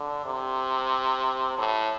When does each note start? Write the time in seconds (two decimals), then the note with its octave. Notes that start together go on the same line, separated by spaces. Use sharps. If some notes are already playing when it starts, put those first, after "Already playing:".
Already playing: D3
0.25 C3
1.58 A2